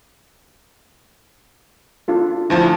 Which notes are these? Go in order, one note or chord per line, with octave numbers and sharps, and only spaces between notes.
D4 F4 A4
D2 F3 D4 E4 A5